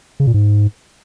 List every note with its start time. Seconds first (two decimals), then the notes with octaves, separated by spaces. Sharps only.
0.20 C#3
0.27 A#2
0.34 G#2